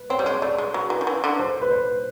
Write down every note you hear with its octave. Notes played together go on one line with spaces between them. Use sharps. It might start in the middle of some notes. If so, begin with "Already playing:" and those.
Already playing: B4
C4 C#5
G3
G#3
A3 D5
G#3
F#3
E3
D#3
E3
D3
C5
B4
C5